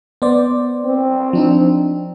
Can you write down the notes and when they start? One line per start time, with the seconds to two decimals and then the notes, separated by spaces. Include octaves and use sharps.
0.22 B3 C5 D5
0.85 C4
1.33 F3 D4 D#4